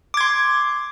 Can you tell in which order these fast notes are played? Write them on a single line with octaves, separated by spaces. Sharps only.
D6 G#6 C6